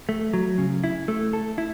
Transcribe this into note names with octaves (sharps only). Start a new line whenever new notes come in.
A3
F#3
C#3
E4
A3
A4
E4